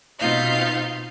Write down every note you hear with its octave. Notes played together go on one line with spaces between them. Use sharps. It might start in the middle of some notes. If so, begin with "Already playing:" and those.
B2 C4 D#4 F4 F5 G6